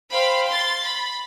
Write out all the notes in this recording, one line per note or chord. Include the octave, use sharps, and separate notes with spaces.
C5 F5 G5 B5
C6 A6
B5